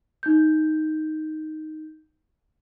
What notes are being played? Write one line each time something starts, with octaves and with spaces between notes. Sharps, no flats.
D#4 G6